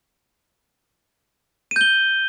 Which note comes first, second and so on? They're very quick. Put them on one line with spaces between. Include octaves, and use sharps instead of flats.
D#7 G6 G7